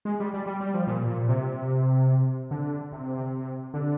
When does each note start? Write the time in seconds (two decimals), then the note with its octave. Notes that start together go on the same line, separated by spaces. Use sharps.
0.05 G#3
0.20 G3
0.34 G3
0.46 G3
0.61 G3
0.74 F3
0.87 A#2
1.08 A#2
1.29 C3
2.51 D3
2.92 C3
3.74 D3